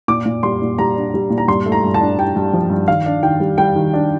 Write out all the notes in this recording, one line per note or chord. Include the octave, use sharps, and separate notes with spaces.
A#2 D6
A#2
G3 C6
A#2
G3 A#5
D4
G3
A#2
A#5
G2 C6
A3
A#5
G2
A5
D4
G2 G5
G2
F3
G2
D#3 F5
D4
D#3 G5
G3
G3 G5
D#3
D4